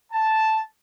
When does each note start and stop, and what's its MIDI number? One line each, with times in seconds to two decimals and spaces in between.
0.12 0.61 81